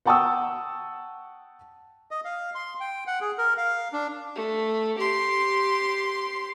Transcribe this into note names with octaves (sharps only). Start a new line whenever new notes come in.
F#5 G5 A5 C#6 D#6 E6
D#5
F5
C6
G5
F#5
G#4
A#4
F5
D4
A3
G4 C6